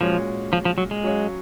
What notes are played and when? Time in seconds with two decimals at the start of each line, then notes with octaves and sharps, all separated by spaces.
0.01 A#2 F3 G#3 C#4 F#4 C#5
0.53 F3
0.65 F3
0.78 F#3
0.91 G#3
1.04 F#3 C#4 F#4 C#5 F5